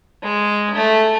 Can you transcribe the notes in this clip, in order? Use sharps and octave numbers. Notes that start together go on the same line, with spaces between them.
G#3
A3